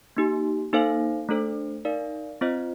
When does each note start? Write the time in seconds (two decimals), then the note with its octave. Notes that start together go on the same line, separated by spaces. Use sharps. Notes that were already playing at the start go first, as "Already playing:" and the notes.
0.17 A#3 D#4 G4
0.73 A#3 D#4 A4 C5 F5
1.29 A3 D4 A4 C5
1.85 D#4 A#4 D5 F5
2.41 C4 F4 C5 D#5